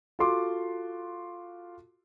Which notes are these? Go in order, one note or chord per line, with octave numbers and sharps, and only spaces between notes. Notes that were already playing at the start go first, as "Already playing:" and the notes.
F4 F#4 A4 C6 D6